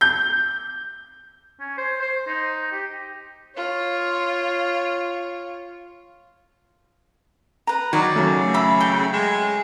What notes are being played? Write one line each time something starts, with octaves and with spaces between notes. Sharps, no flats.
G6
C#4
C5
C5
D#4
G4
F4 C#5
B4 A#5
D#3 F#3 D5
C#3 F#3 A3
E5 B5 D6
G5
G#3